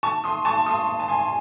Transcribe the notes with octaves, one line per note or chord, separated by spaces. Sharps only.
A5 C#6
C6 D#6
A5 C#6
C6 D#6
A5
G#5 C6